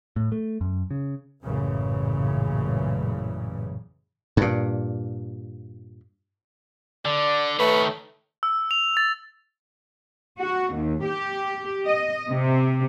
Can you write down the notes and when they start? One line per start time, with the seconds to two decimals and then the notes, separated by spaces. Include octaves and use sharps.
0.16 A2
0.32 A3
0.61 F#2
0.91 C#3
1.42 A1 F#2 A#2 C#3 E3
4.37 G2 A#2
7.05 D3 D5
7.59 D#3 A3 B4 C#5
8.43 E6
8.71 F7
8.97 A6
10.39 F#4
10.75 D#2
11.04 G4
11.86 D#5
12.30 C3